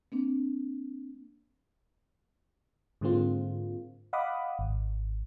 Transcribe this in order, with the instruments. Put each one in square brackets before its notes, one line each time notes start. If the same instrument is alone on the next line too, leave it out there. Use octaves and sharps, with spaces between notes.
[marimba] A#3 C4 D4
[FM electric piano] G#2 D3 G#3 A#3 C4 F4
D#5 F5 F#5 B5 D6 D#6
G#1